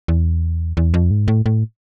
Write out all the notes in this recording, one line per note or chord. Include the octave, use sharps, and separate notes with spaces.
E2
E2
F2
G#2
A2
A2